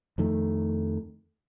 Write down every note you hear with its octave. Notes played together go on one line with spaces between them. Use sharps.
F2 D#3 A3